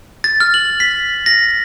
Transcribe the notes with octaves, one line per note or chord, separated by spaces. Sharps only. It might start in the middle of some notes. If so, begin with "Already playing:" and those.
A6
F6
F#7
B6
A#6